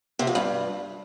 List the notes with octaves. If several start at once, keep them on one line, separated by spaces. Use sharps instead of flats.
C3
F2
G2